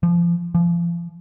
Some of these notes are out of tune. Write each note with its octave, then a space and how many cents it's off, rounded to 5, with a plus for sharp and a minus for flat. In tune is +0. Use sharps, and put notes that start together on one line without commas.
F3 -25
F3 -35